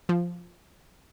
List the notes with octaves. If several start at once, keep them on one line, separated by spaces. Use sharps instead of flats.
F3